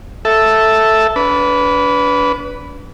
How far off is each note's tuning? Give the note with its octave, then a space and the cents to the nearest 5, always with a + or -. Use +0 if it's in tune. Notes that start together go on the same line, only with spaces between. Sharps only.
A4 +0 E5 +0
D4 -35 B4 +0